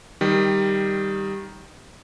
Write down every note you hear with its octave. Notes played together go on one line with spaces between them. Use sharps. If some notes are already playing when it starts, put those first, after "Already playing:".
D#3 G3